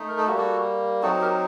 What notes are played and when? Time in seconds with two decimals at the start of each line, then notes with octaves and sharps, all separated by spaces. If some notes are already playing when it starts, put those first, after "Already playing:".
Already playing: A3 D#4
0.08 A#4
0.18 A4
0.27 G3 A#3 F#4 G4
0.38 F#4 A4
1.02 F#3 C4 D#4 F#4 A4
1.21 G4 A#4